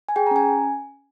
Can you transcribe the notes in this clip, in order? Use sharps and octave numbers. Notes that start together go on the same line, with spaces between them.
G#5
G#4 G5
A#5
C#4 G#5